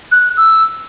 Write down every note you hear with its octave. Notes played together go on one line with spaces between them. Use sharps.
F#6
E6